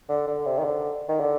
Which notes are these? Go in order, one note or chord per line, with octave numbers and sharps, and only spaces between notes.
D3
D3
C3
D#3
D3
D#3
D3